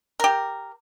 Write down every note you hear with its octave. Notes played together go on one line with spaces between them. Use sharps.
G4 A#4